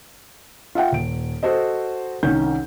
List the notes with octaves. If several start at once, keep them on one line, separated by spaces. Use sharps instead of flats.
F4 E5 F#5 G5
D#1 D7
F#4 A4 C5 D#5
C2 D#3 C#4 G6